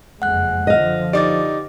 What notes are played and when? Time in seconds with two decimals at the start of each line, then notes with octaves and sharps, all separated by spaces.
0.22 F#1 F2 G#3 F#5 F#6
0.67 D3 F3 D#5 F5
1.13 D#4 G4 D5 D6 A6